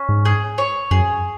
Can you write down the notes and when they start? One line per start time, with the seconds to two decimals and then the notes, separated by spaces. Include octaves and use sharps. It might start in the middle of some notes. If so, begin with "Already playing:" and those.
Already playing: C#4
0.09 G#2
0.25 G#4
0.58 C#5
0.91 F#2 G#4